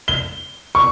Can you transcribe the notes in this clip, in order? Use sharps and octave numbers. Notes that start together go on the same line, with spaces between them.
G7
C#6